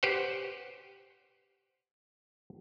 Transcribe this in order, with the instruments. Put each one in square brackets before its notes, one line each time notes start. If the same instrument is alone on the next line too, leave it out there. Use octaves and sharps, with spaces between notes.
[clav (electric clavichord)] G4 B4 C5 F#5